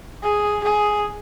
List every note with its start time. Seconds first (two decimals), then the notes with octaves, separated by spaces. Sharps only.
0.23 G#4
0.64 G#4